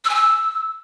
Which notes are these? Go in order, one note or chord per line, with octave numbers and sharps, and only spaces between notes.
E6
G#5
E6